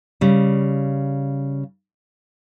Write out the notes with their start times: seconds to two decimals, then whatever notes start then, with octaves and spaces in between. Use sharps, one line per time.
0.21 C#3 G3